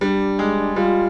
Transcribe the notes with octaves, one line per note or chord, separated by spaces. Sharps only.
G3 D4
G#3
G3 F4